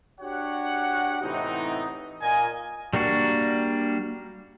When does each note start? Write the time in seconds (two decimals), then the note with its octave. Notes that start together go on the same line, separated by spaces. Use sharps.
0.21 D4 F#4 G4 C#5 F#5
1.22 A2 C3 E3 B3 C4 D#4
2.21 A#2 A#4 D#5 G#5
2.93 G3 A#3 D4 F#4